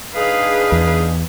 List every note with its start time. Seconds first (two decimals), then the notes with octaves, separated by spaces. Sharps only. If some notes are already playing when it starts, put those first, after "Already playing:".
0.15 D4 D#4 G#4 B4 F5
0.72 E2